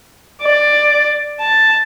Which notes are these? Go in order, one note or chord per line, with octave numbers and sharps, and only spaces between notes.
D5
A5